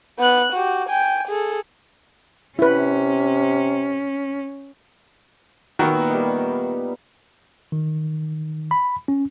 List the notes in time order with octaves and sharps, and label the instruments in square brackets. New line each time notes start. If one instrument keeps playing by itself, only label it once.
[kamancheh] B3 F#6
F#4 G4
G5 G#5
G#4 A4
[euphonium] C3 [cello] C#4 [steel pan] E4 B4
[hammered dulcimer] A#2 B3 E5 [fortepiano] D#3 F#4 A#4
[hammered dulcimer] G3 D#4
[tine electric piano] D#3
B5
C#4